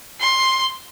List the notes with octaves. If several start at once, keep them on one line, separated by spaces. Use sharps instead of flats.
C6